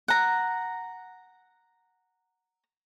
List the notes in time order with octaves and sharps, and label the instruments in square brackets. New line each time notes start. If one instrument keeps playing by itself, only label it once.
[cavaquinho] F#5 A#5